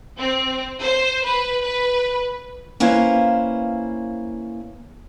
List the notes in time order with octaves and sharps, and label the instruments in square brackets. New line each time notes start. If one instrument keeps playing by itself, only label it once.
[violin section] C4
C5
B4
B4
[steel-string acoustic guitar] A#3 C#4 E4 B4 C5 F5